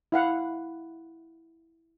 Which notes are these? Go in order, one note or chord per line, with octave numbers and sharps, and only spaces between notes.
E4 F5 F#5